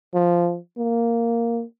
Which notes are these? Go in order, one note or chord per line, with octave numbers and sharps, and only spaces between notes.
F3
A#3